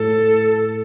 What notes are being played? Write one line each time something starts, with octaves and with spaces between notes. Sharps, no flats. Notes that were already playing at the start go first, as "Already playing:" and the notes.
Already playing: A2 A4